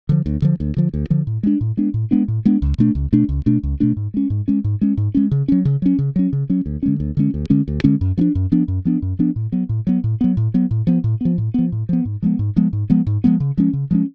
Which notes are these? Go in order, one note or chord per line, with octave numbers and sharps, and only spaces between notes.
D3 F3
D2
D3 F3
D2
D3 F3
D2
D3 F3
A2
G#3 B3 D4
A2
G#3 B3 D4
A2
G#3 B3 D4
A2
G#3 B3 D4
C#2
B2 A3 D4
C#2
B2 A3 D4
C#2
B2 A3 D4
C#2
B2 A3 D4
G#2
G#3 C#4
G#2
G#3 C#4
G#2
G#3 C#4
G#2
G#3 C#4
C#3
F#3 C#4
C#3
F#3 C#4
C#3
F#3 C#4
C#3
F#3 C#4
D2
D3 G#3 C#4
D2
D3 G#3 C#4
D2
D3 G#3 C#4
D2
D3 G#3 C#4
F#2
F3 B3 D4
F#2
F3 B3 D4
F#2
F3 B3 D4
F#2
F3 B3 D4
A2
F#3 B3
A2
F#3 B3
A2
F#3 B3
A2
F#3 B3
A2
F3 B3
A2
F3 B3
A2
F3 B3
A2
F3 B3
G#2
F3 G#3 B3
G#2
F3 G#3 B3
G#2
F3 G#3 B3
G#2
F3 G#3 B3
C#3
F3 G#3 C#4
C#3
F3 G#3 C#4